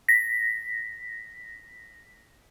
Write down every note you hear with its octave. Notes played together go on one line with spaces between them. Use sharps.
A#6 B6